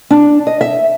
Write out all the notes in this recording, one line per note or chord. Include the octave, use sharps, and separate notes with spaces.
D4
D#5
E5